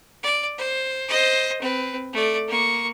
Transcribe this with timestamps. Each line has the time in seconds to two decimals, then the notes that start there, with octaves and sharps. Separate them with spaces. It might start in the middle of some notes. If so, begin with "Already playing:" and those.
0.23 D5
0.58 C5
1.08 C5 D#5
1.61 C4 B4
2.13 A3 D5
2.48 A#3 C#6